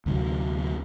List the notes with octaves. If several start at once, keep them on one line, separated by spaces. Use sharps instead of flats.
D2 C3 F#3